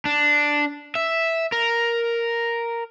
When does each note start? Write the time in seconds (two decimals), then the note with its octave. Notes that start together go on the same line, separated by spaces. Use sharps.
0.05 D4
0.95 E5
1.52 A#4